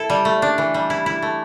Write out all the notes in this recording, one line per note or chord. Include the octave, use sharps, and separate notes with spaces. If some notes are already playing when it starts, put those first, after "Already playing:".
Already playing: E4 A4
G3
A3
D4
E3
G3
E4
E4
A3